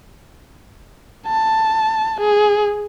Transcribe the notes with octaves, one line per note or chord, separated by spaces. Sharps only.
A5
G#4